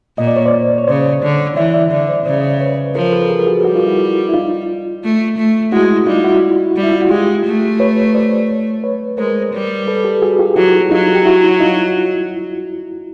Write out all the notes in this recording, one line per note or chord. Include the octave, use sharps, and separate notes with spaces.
A#2 D#5
D5
C#5
C5 D5
C#5
C#3 C5 D5
D3
E3 D5 E5
D5 E5
D3
C5 D5
C#3 C5 D5
B4 C#5
F3 A#4 C5
A4 B4
G#4 A#4
F#4 G#4
G3 F#4
F4
E4 F#4
E4
D#4 F4
A3
A3
G#3 E4 F#4
G3 D#4 F4
E4 F#4
G3
E4
F4
F#4
G#3 F4 G4
A3
B4 C#5
C5 D5
B4 C#5
G#3 A#4 C5
G3
A4 B4
G4 A4
F#4 G#4
F4 G4
F#3 E4 F#4
F#3 D#4 F4
G4
E4 F#4
D#4 F4